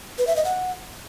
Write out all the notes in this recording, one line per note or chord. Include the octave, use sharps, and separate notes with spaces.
B4
E5
D#5
F#5